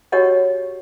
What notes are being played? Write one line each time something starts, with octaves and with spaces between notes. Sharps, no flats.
F#4 G4 A#4 C#5 D#5 F#5